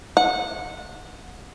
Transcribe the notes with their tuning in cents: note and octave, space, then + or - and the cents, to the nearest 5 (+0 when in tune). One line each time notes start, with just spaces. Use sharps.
F#5 -20